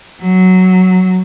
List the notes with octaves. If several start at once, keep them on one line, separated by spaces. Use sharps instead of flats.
F#3